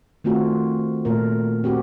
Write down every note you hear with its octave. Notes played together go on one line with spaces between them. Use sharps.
D#3 A3 C4 F4 F#4
A#2 A3 A#4
C4 F#4 G4